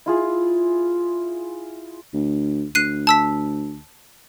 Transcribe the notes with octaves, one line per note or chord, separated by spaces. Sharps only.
E4 F4 G#4
D2
D2 F#6 C7 D#7
A5 E6 B6